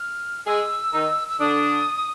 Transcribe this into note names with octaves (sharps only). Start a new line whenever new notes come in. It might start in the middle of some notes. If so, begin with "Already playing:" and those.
Already playing: F6
G#3 G#4 E6
D#3 D#4
E6
D3 D4 D#6